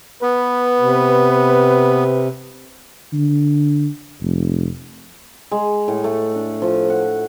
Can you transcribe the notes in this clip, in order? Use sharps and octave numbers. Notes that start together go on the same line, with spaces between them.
B3 B4
C3
D3
F1
G#3
A2
A3
D4
F3
F#5